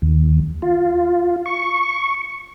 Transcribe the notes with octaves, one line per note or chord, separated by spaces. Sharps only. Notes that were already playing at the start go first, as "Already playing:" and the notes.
D#2
F4
C#6